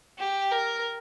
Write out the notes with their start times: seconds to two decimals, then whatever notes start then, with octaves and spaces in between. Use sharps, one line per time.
0.18 G4
0.52 A#4